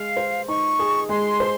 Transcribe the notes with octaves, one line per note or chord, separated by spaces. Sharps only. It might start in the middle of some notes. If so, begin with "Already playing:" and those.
Already playing: G#3 F5
C5
D#4 C#6
G#4
G#3 C6
C5